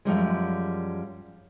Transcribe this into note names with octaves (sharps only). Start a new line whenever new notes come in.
F#2 F3 G3 G#3